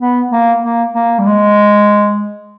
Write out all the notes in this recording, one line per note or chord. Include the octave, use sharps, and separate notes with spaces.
B3
A#3
A#3
A#3
G3
G#3